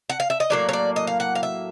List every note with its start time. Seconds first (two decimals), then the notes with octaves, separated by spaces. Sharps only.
0.10 F#5
0.20 F5
0.30 E5
0.40 D#5
0.50 A2 F#3 A#3 D5
0.69 C#5
0.73 D5
0.96 D#5
1.07 F5
1.20 F#5
1.35 F5
1.43 E5